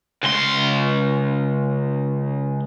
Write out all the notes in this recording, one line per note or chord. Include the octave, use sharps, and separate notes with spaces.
C#2 C6